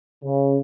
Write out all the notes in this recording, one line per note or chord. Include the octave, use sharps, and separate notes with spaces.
C#3